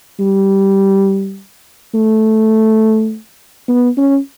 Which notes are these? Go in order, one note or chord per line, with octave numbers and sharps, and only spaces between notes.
G3
A3
B3
C#4